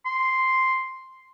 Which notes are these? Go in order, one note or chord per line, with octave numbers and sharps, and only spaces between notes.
C6